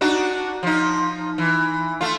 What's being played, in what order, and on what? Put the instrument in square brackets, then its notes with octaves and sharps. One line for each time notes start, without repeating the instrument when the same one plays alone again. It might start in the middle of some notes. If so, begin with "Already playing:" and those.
[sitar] D4 D#4 F#4
F3 D#4
E3
A3 F4